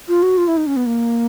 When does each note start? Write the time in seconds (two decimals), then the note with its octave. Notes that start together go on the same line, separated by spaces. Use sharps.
0.08 F4
0.23 F#4
0.38 F4
0.48 E4
0.57 D#4
0.67 C#4
0.76 B3
0.86 A#3